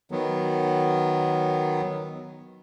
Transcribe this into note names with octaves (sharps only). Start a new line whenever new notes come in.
D#3 F#3 B3